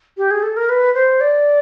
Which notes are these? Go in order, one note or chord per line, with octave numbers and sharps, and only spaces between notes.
G4
G#4
A4
A#4
B4
C5
D5